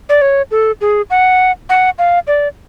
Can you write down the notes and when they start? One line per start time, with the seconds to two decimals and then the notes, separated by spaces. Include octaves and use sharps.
0.09 D5
0.21 C#5
0.51 A4
0.81 G#4
1.10 F#5
1.69 F#5
1.99 F5
2.27 D5